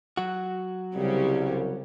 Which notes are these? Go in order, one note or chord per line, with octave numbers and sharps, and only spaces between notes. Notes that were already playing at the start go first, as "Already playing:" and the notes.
F#3 F#4
C2 C#3 G3 C#4